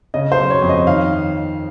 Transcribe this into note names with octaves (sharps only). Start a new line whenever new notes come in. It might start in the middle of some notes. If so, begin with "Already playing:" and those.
C#3 D#5
C5
F#3
C#5
F2
D#5
D#3 F5